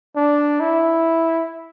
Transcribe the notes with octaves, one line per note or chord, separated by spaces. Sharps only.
D4
E4